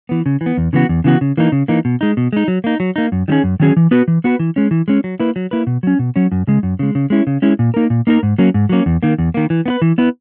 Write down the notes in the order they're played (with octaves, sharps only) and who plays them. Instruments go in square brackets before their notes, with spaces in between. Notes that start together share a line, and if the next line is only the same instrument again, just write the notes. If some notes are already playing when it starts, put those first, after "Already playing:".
[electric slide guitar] E3 B3
C#3
E3
B3
E2
C#3 E3 B3 F#4
E2
C#3 E3 B3 F#4
C#3
E3 A#3 D#4
C#3
E3 A#3 D#4
B2
G#3 D#4
B2
G#3 D#4
F#3
A#3 D#4
F#3
A#3 D#4
F#2
D#3 F#3 C#4 G#4
F#2
D#3 F#3 C#4 G#4
E3
B3 F#4 B4
E3
B3 F#4 B4
E3
G#3 C#4
E3
G#3 C#4
F#3
A#3 E4 B4
F#3
A#3 E4 B4
B2
F#3 C#4
B2
F#3 C#4
F#2
C#3 G#3
F#2
C#3 G#3
C#3
G#3 C#4 E4
C#3
G#3 C#4 E4
A#2
A#3 D#4 A#4
A#2
A#3 D#4 A#4
G#2
F#3 A#3 C#4
G#2
F#3 A#3 C#4
E2
D#3 A#3
E2
D#3 A#3
E3
B3 E4 B4
E3
B3 E4 B4